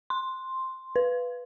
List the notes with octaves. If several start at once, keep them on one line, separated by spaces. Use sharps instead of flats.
C6
B4